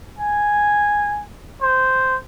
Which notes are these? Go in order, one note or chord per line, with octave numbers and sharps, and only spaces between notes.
G#5
C5